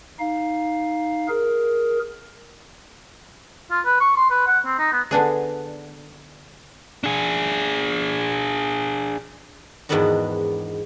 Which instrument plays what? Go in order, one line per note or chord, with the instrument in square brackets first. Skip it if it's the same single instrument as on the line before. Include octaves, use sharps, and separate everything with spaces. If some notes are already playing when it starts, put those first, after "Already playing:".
[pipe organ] D#4 F5
G#4 A#4
[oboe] F4
B4
C#6
C6
B4
F#5
C4
D#4
B3
[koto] D3 B3 D4 G#4
[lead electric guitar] D4 G#4
[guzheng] E2 G#2 D#3 B3 D4 F#4